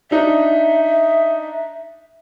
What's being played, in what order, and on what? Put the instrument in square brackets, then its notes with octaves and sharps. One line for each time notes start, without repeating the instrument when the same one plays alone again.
[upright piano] D4 D#4 [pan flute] E5